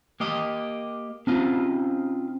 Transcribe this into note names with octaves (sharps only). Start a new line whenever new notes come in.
A#3 G4 D#5
C4 C#4 D#4 F4